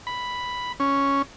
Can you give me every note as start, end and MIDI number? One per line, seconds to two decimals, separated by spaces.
0.07 0.72 83
0.80 1.22 61